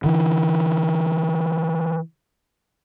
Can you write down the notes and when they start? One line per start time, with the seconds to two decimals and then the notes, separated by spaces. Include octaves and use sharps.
0.04 D3 E3